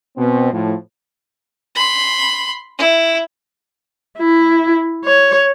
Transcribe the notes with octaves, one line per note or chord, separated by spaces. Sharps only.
B2 C4
A2 F3
B5 C6
E4
E4
C#5